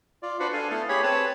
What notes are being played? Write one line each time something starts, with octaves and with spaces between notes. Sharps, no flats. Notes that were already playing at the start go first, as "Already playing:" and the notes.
F4 D5
D4 F#4 B4 C5 D5 F#5
D4 A4 F5 G#5
A3 B3 E4 A4 F5
G4 G#4 C#5 B5
C4 B4 C#5 A5